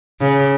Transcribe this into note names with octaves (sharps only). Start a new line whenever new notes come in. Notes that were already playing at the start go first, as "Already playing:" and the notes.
C#3